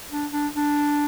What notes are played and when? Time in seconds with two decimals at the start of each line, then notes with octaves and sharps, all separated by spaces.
0.11 D4
0.32 D4
0.55 D4